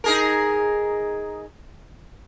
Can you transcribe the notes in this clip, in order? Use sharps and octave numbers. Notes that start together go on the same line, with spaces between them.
D#4 G#4 A#4